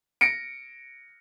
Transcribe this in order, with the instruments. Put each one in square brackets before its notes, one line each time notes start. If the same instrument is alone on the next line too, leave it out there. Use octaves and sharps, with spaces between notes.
[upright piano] A#6 C#7 D7